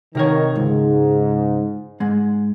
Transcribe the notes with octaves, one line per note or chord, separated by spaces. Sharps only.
C3 D#3 A#4 C#5
C#2 G#2
G#2 G#3